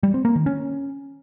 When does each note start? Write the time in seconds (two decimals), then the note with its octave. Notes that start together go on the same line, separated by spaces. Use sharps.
0.03 G3
0.14 C4
0.25 A#3
0.35 D#3
0.46 C#4